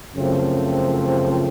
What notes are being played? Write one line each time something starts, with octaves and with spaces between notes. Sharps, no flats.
F#2 C#3 F3 A3 C4